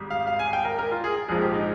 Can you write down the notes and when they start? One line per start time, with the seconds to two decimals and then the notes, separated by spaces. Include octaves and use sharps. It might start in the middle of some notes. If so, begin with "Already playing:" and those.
Already playing: G#1 G#2 G3
0.10 F5
0.27 F5
0.39 G#5
0.53 G5
0.65 A#4
0.79 A#4
0.91 F4
1.04 G#4
1.28 A#1 G#2 F3 G#3 G#4
1.42 G4
1.54 D#4